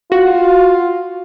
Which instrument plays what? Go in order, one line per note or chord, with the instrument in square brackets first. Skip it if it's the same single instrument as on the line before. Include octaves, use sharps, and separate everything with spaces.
[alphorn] F4 [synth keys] F#4